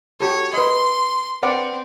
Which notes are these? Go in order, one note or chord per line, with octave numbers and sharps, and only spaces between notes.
F#4 G4 A4 C#5
B4 D#5 C6
C4 B4 D5 F#5